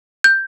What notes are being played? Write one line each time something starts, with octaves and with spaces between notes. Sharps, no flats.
G6